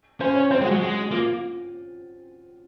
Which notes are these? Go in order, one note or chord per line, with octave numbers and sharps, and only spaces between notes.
C#4 C5
C#5
C4 C5
G#3
F#3 F#4
G#3
A#3 F4